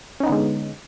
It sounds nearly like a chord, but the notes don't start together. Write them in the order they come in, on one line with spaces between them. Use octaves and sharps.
C#4 D#4 B3 D3 G#3